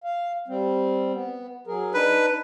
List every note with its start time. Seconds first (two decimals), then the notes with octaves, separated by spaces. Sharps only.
0.04 F5
0.48 G3 C4
1.14 B3
1.67 F#3 G#4 A#4
1.94 D4 D#4 B4